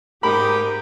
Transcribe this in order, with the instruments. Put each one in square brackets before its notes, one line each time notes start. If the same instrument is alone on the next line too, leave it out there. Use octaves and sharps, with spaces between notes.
[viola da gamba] G#2 G#3 D#4 [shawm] G4 [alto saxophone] A#4 [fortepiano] B5